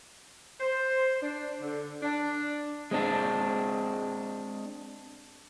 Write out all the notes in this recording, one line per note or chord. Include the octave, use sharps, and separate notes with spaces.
C5
D4
D3
D4
G#3 C4 D4